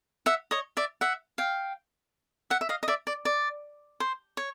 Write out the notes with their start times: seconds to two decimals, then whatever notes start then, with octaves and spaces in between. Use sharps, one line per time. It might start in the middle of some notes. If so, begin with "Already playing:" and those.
0.26 E5 F#5
0.51 C#5 D#5
0.77 D5 E5
1.01 E5 F#5
1.38 F5 G5
2.50 E5 F#5
2.61 E5
2.69 D#5 F5
2.83 D#5
2.88 D5 E5
3.07 D5
3.25 D5
4.00 C5
4.37 C#5